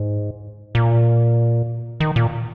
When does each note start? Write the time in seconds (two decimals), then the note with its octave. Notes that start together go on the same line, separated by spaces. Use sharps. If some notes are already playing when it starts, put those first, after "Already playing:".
Already playing: G#2
0.75 A#2
2.00 D#3
2.16 A#2